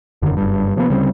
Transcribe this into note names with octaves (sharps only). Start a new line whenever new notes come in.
E1 F#2 D3 D#3
F#1 G2
C3 F3 A#3 B3
D2 C#3 G3 C4